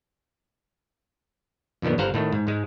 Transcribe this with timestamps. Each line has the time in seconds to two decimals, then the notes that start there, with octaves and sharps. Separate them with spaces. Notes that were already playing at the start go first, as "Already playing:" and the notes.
1.82 F2 A#2 D3 D#3 B3
1.98 G1 G2 C5 F5 F#5 A#5
2.14 A2 D#3 A3
2.33 G#2
2.47 G#2 G#3